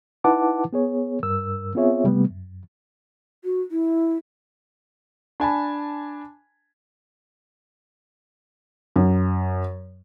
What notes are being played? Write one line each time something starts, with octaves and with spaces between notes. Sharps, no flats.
D#4 E4 B4 F#5 A5 D6
B3 G#4 C#5
G2 A#4 E6
B3 C4 F4 G#4 C#5 E5
C3 G3 A3 B3
F#2
F#4
E4
D4 G#5 A5 B5
F#2